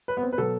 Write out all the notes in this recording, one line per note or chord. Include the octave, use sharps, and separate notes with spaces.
B4
B3
C4
B4
B2 F#3 A4